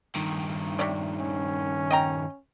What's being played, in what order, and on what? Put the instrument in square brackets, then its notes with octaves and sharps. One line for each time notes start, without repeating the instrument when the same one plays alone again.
[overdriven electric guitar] G2 D#3
[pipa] C3 C#5 D5
[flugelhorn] C#4
[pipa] D#5 G5 A#5